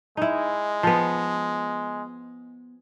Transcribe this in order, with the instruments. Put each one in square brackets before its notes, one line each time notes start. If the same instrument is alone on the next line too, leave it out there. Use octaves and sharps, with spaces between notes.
[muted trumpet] G#3 [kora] D#4 E4
[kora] F3 B3